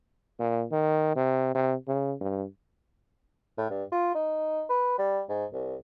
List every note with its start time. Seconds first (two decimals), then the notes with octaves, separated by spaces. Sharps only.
0.39 A#2
0.72 D#3
1.16 C3
1.55 C3
1.88 C#3
2.21 G2
3.58 A2
3.70 G2
3.92 F4
4.15 D#4
4.70 B4
4.99 G3
5.29 G#2
5.53 C2